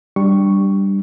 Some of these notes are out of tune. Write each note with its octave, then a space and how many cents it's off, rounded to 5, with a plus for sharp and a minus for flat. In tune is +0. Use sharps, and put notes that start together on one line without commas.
G3 +0 D4 +0 C#6 +0